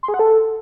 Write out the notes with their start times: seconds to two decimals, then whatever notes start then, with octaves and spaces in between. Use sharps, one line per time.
0.03 C6
0.08 G#4
0.14 F#5
0.19 A4